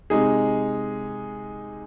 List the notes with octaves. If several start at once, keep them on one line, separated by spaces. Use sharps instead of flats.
C3 G#3 D#4 G#4